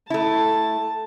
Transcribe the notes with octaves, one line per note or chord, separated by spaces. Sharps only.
A3 E4 A5